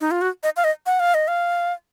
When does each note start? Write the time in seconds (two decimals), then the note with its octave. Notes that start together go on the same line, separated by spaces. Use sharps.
0.01 D#4
0.11 F4
0.21 F#4
0.43 D#5
0.56 F5
0.64 D#5
0.86 F#5
1.00 F5
1.14 D#5
1.28 F5